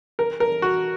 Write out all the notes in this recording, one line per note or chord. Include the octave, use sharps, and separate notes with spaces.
A#4
A#4
F#4